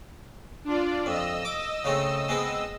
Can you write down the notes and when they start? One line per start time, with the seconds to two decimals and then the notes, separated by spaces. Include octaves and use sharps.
0.65 D4 F4 D5
1.06 F2 D#5 E6
1.45 D6
1.84 C#3 A3 C4
2.29 G#3 B3 C4